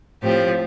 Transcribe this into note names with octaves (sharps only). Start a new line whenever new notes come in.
A2 F3 C4 G4